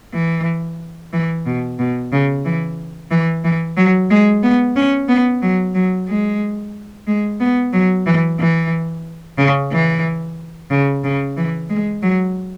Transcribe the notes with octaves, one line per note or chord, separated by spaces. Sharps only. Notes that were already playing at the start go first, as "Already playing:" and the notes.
E3
E3
B2
B2
C#3
E3
E3
E3
F#3
G#3
B3
C#4
B3
F#3
F#3
G#3
G#3
B3
F#3
E3
E3
C#3
E3
C#3
C#3
E3
G#3
F#3